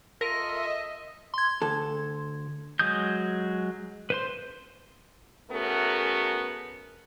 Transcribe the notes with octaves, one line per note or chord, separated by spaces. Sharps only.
F4 A4 A#4 D#5 E5 A#6 B6 D#7
C6 G#6
D2 A4
F#3 G#3 D#6 G6
B4 C5 C6
A3 B3 C#4 F#4 G#4 A#4